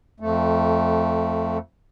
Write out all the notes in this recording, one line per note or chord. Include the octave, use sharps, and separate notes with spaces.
F2 A3